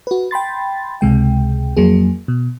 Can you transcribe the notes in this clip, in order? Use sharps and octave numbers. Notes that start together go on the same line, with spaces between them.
F#4 B4
G5 B5 C6 A6
C#2 C3 G#3 G5
F2 F#3 A#3 G#4
B2